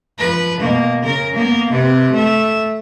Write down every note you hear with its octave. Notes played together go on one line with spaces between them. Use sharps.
F3 B4
B2 A#3
C#3 A#4
A#3 B3
C3 B4
A3 E5